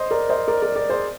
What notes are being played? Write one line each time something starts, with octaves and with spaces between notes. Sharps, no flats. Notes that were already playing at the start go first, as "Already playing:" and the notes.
Already playing: C5 D#5
A#4 D5
C5 D#5
A#4 D5
A#4 D5
A#4 D5
G#4 C5